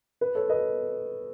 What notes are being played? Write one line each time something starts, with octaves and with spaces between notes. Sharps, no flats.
B4
A4 C#5
B4 D#5